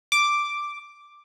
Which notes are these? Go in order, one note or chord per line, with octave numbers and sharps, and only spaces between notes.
D6